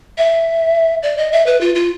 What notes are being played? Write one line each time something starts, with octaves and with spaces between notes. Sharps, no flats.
E5
D5
D#5
E5
B4
F4
F4